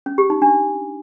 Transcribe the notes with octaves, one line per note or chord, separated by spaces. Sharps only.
C#4
G4
D#4
D4